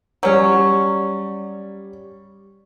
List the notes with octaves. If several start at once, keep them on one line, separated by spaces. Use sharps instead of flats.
F#3 G3 C#4 D5